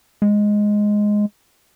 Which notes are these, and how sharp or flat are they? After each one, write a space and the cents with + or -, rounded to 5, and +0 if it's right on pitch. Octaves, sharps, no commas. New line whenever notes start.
G#3 +0